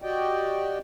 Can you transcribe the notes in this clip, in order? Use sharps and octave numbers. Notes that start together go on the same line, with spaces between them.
F#4 G4 D5 D#5 G5